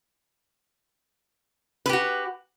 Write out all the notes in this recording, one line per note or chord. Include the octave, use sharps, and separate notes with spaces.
F#4 G4 B4